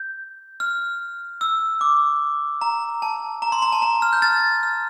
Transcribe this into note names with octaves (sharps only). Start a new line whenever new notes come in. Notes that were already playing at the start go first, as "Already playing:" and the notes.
Already playing: G6
F6
E6
D6
A#5
A5
A#5
C6
A#5
A5
A#5
F6
G6
F6 A6
F6